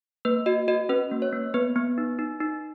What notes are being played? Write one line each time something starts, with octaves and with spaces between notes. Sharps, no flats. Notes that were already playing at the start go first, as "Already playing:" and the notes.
A#3 B4
F#4 D#5
F#4 D#5
C#4 B4
A#3
C#5
A#3
B3 B4
B3
D#4
D#4
D#4